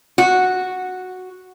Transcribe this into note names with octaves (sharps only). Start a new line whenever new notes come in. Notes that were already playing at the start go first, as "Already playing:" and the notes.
F#4